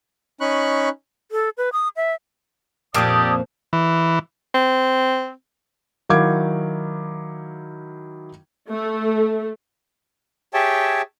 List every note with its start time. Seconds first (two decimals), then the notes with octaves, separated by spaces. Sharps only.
0.41 C#4 D#4 B5 C#6 F#6
1.32 A4
1.58 B4
1.73 D#6
1.96 E5
2.94 F2 A#2 F3 A#3 G4 A4 D5 D#6
3.73 E3
4.54 C4
6.09 D#3 F#3 E4 F5 D6 G#6
8.70 A3
10.54 G4 G#4 C#5 E5 G5 A5